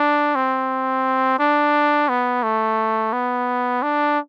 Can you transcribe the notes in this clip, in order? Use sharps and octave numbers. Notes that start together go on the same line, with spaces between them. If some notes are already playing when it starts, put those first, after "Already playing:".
Already playing: D4
C4
D4
B3
A3
B3
D4